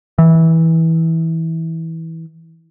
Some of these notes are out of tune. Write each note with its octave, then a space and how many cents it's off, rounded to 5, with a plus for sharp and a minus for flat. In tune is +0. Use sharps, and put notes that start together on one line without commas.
E3 -20